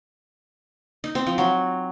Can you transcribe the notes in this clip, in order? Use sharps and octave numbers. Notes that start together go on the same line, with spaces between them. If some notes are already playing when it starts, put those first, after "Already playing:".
D#4
C4
F3
F#3